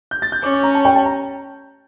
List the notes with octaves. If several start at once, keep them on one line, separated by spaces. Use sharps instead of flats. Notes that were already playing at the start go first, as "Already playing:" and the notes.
G6
A6
G6
C#4 D6
C#6
A#5
A5
G5
A5
A#5